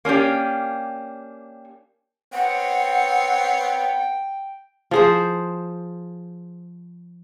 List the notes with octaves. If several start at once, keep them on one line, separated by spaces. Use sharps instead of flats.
A#3 C#4 D4 G4
B3 C4 C#5 F#5 G5
F3 G#4 C5